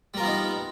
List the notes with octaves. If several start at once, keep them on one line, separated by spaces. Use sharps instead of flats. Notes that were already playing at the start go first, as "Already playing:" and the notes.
G3 B3 D#4 F4 A#4